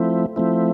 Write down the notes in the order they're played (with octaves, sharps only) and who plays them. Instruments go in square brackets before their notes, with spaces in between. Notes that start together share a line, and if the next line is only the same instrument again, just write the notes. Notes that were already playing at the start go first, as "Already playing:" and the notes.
Already playing: [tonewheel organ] F3 A3 C4 E4
F3 A3 C4 E4